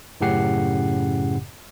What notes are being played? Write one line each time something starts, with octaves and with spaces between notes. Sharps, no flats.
F#2 A2 C#3 G4 F#5 C7